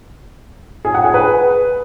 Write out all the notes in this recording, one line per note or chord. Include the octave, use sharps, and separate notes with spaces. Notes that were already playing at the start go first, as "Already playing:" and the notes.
G#4
F#5
G#4
B4